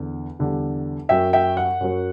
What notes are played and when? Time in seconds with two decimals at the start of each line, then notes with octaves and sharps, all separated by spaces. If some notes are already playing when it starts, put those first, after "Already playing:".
Already playing: E2 D3
0.39 E2 D3 G3
1.09 F#2 F#3 E5 G5
1.33 E5 G5
1.57 F#5
1.81 F#2 F#3